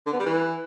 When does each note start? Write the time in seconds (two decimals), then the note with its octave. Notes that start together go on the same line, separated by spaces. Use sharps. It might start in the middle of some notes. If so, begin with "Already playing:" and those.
0.06 D3
0.13 B3
0.19 G3
0.26 E3